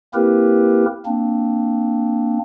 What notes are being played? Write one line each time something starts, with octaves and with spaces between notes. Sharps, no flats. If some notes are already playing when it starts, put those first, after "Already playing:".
A#3 C4 E4 G4 A#4 B4
A#3 C4 D4